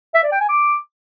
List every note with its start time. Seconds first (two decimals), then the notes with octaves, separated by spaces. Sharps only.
0.15 E5
0.23 D5
0.32 G5
0.40 G#5
0.49 D6